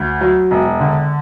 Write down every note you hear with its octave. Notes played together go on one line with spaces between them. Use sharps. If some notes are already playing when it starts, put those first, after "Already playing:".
Already playing: D2
F#3
E1
D3